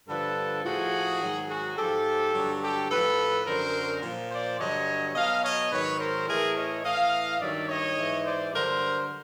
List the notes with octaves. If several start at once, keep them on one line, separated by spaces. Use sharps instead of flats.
G2 D3 F3 A4 B4
A2 F3 F#4 G#4
G#2 D#3 F#3
F#4 G#4
G#2 F3 G4 A4
G2 D3 F#3
G4 A4
A2 F3 A4 B4
F#2 D3 F#3 A#4 C5
A#2 F3
C5 D5
G2 D3 F#3 C#5 D#5
B2 F#3 D#5 F5
C#5 D#5
G#2 D#3 F#3 B4 C#5
A#4 C5
A2 E3 G#4 A#4
C#5 D#5
A2 E3 D#5 F5
G2 D#3 F#3 D5 E5
C#5 D#5
G#2 E3
C5 D5
G2 D3 F#3 A#4 C5